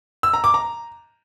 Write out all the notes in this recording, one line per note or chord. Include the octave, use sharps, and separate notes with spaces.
E6
A#5
D6
A#5